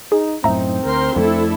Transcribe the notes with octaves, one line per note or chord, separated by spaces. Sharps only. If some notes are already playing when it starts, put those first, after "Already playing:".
D#4 G#4
F#2 A2 C4 D#4 E5 A#5
D2 A#4 C5 C6
F2 F3 A3 D4 E4 A4